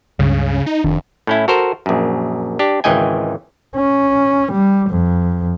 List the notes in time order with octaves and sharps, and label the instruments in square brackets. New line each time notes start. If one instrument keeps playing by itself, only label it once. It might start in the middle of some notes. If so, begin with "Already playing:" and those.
[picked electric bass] C#2 G2 [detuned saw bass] C#3
[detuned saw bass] D#4
[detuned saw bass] F1 [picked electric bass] D#3 D4
[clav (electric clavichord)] A2 C#4 E4
F#4 A4 A#4 C5
A#1 F#2
D4 G4
G#1 C#2 E3 D#5 G5 G#5
[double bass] C#4
G3
F2